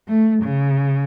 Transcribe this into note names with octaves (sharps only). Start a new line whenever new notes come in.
A3
C#3